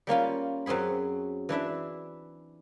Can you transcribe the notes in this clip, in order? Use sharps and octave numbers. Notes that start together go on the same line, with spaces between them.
G3 A#3 C#4 F4
F#2 C4 C#4 G#4 B5
E3 D4 E4 E5